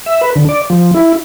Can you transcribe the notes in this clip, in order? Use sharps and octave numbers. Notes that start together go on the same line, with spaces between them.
E5
B4
D3
D5
F3
E4